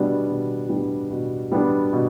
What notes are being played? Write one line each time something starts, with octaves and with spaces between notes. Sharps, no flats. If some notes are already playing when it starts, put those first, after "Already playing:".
Already playing: B2 G3 B3 D4
B2
G3 B3 D4
B2
G3 B3 D4
B2